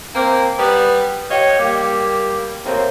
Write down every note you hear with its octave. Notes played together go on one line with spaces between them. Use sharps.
A#3 C4
G3 B3 B4
G4 C#5 D#5 F5
G3 A#3
D#2 A2 A#3 C4